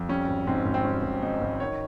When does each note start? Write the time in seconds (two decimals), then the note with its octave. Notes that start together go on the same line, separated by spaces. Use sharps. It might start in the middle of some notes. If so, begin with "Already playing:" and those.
Already playing: F2
0.09 G3 C#4
0.28 G#1
0.47 G#2 C4
0.66 G#1
0.74 C4
0.84 G3 C#4
1.03 G#1
1.22 G#2 D#4
1.41 G#1
1.60 D#3 C#5